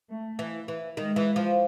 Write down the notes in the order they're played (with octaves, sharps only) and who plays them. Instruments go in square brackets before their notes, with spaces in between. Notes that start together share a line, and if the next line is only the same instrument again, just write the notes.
[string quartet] A3
[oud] E3
E3
[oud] D#3 [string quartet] G#3
[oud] E3
F3